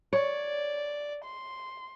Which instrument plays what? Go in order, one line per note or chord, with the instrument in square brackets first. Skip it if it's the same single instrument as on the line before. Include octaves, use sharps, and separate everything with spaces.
[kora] C#5 [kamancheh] D5
[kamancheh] C6